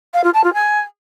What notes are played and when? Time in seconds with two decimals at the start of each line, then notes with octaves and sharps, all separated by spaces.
0.14 F5
0.24 F4
0.34 A5
0.44 F4
0.54 G#5